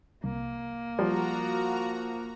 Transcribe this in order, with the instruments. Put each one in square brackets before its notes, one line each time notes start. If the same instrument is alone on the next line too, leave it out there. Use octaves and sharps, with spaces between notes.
[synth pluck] C2 [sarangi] A#3
[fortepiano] F3 [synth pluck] G3 [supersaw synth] F#4 A#5